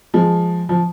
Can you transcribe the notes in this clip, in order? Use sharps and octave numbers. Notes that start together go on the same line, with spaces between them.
F3 G#3
F3